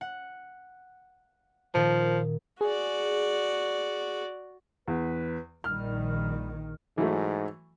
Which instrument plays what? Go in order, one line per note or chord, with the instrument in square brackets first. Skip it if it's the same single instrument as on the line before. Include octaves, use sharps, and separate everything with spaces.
[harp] F#5
[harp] A#2 D#3 [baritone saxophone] F3
[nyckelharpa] F#4 D5 [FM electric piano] G#4
[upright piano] E2 [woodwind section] B4
[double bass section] A#1 D#3 [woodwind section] G3 [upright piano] F6
[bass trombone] G#2 [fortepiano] E3 F#3 A3